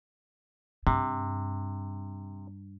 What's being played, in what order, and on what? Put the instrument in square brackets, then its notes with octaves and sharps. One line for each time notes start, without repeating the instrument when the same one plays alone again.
[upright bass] G2 [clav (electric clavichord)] C3